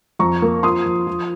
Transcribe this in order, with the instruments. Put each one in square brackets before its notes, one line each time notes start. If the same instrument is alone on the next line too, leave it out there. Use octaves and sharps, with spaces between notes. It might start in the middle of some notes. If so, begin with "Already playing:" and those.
[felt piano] F2 A#5 C#6
A#3
F3 C6 D#6
F3
F3